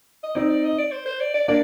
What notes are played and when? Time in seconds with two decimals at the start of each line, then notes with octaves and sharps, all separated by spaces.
0.23 D#5
0.35 C4 D#4 D5
0.50 D5
0.64 D#5
0.78 D5
0.92 C5
1.06 C5
1.20 D5
1.34 D5
1.48 A#3 D4 D5